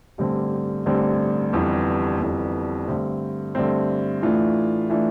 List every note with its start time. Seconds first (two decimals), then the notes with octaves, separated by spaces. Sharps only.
0.18 A1 G2 D3 G3 C4
0.86 A1 G2 D3 G3 C4
1.53 G1 F2 E3 G3
2.20 G1 F2 E3 G3
2.88 G2 D3 A3 C4
3.55 G2 D3 A3 C4
4.22 A2 E3 A3 D4 F4
4.89 A2 E3 A3 D4 F4